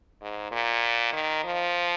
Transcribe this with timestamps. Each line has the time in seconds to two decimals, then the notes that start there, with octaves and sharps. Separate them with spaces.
0.22 G#2
0.51 A#2
1.13 D#3
1.44 F3